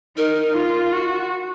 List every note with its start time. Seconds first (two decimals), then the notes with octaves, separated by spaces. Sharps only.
0.17 D#4 A#4
0.56 F4
0.93 F#4